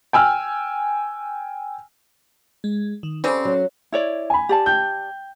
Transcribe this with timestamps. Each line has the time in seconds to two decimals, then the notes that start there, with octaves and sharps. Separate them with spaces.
0.13 G5 G#5 E6 F6
2.64 G#3
3.03 D#3
3.24 C#3 G3 C4 C#4 A4 C5
3.45 F#3
3.92 E4 C#5 D5
4.30 G#5 B5
4.49 G4 D5 A5
4.66 G5 G6